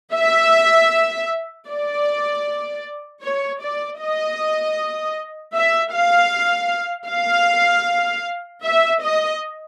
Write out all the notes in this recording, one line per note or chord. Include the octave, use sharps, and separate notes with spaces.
E5
D5
C#5
D5
D#5
E5
F5
F5
E5
D#5